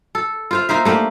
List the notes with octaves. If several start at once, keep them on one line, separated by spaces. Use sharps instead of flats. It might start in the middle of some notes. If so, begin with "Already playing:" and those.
A4
F4 C5 F5
A#3 D#4 C5 E5
A3 A#3 D4 G4